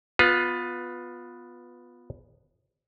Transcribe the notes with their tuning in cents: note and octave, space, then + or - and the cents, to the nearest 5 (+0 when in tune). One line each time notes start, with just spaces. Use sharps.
B3 +0 F4 +20 B4 +5